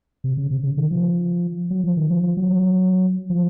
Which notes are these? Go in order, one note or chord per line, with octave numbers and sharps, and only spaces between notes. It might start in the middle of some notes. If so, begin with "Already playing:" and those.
C3
C#3
C3
C#3
D#3
F3
F#3
F3
D#3
F3
F3
F#3
F#3
F3